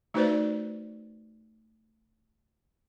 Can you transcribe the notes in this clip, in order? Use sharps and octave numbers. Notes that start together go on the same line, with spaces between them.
A3 D#4 F#4 B4 C5 D5